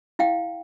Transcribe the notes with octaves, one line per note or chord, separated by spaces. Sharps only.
E4 F5 G5